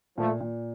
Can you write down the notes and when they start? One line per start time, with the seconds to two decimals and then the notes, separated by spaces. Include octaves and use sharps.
0.17 A#2 F3 A3
0.41 A#2